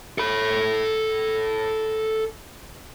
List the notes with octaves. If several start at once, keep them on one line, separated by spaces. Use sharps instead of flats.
A4 B5